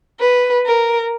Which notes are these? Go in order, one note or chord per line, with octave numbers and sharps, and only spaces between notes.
B4
A#4